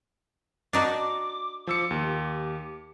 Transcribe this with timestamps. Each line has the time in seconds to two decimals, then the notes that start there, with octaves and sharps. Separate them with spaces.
0.73 D4 D#4 F#4 D6
1.67 F3 D6 E6 C#7
1.91 D#2 G4